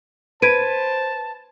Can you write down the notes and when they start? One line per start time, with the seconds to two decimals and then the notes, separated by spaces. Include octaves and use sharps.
0.42 B4 C5 A5 G#6 D7 D#7